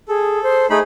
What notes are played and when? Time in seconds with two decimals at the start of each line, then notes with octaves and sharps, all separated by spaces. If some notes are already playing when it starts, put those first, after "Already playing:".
0.08 G#4 A4
0.43 C5
0.70 A3 D#4 G#4 B5